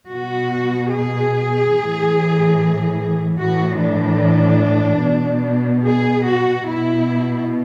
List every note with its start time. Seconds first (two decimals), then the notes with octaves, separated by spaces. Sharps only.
0.12 B2 F#4
0.94 G#4
1.76 A2 E3
3.41 A2 E3 F#4
3.82 D4
5.05 B2
5.87 G#4
6.28 F#4
6.69 B2 E4